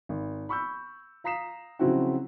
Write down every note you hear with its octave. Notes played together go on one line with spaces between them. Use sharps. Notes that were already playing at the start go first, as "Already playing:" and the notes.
G#1
B5 C#6 E6 G6
F5 A#5 D#6 B6 C7 E7
C#3 F3 F#3 C4 E4 F#4